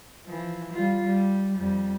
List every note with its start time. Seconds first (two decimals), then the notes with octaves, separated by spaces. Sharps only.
0.26 E3 F3
0.73 G3 F4
1.04 G3
1.57 F2 G3